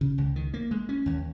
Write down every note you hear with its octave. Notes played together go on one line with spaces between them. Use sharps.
C#3
C#2
D#3
A#3
G#3
C#4
D#2